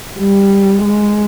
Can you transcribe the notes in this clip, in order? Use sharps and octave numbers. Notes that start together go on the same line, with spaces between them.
G3
G#3